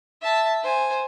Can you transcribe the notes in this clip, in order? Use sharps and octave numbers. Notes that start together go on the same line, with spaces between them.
E5 A5
C5 G#5